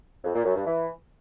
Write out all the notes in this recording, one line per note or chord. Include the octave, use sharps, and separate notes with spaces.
F2
A#2
F#2
G2
E3